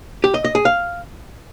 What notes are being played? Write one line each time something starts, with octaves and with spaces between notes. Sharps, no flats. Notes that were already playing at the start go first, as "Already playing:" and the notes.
G4
D#5
D#5
G#4
F5